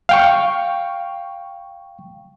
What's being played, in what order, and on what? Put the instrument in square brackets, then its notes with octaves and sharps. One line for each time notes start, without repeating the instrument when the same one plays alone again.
[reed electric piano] F5 G5 C#6